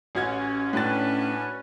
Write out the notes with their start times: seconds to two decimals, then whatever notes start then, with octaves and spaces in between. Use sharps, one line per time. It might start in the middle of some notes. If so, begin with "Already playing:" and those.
0.15 A1 C#4 F#4 G#6
0.73 A2 D4 F#4 B4 A6